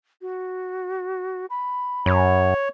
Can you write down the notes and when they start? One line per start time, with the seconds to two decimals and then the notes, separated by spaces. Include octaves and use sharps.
0.22 F#4
1.50 B5
2.06 F#2 C#5